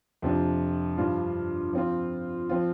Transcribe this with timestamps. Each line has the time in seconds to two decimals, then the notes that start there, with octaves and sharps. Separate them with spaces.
0.22 F2 C3 F3 D4
0.98 G2 F3 D4 F4
1.73 F3 C4 F4
2.49 F3 C4 F4